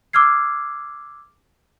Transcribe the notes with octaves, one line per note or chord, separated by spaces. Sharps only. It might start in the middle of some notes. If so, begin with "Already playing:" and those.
D6 E6 F6 G#6 C7